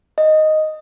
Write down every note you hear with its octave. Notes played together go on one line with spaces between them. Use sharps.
D#5